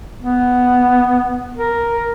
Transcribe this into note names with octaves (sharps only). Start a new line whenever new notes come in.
B3
A#4